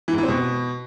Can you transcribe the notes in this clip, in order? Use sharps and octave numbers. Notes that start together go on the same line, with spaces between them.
E3
G#2
E3
C4
B2